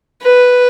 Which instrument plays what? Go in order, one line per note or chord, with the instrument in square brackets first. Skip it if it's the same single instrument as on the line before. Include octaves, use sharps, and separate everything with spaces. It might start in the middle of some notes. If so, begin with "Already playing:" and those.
[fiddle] B4